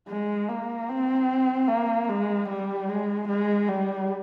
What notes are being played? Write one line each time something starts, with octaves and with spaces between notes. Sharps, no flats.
G#3
A#3
C4
A#3
G#3
G3
G#3
G#3
G3